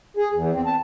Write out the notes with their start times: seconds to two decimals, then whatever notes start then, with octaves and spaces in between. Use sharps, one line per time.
0.17 G#4
0.33 E2
0.53 C4
0.66 A5